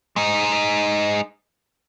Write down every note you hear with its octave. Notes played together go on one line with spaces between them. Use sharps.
G#3 D#4